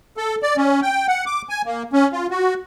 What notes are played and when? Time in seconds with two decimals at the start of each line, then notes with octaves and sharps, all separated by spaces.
0.17 A4
0.43 D5
0.57 C#4
0.82 G5
1.08 F#5
1.26 D6
1.49 G#5
1.66 A#3
1.93 C#4
2.13 F4
2.31 F#4